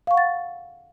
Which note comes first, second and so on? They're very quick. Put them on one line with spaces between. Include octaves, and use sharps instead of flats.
F5 C#6 F#5 A6